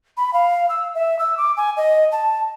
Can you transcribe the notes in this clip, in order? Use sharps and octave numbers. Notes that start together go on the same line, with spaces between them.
B5
F5
E6
E5
E6
D6
G#5
D#5
A5